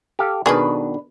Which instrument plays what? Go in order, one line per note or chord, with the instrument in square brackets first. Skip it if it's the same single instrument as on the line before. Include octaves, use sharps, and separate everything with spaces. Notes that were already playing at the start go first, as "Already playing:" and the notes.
[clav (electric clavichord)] G4 A4 F5
[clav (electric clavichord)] B2 D#3 [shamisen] G#3 G#4 [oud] D4 B4